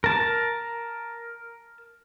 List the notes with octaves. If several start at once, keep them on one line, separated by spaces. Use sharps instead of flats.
A#4 A5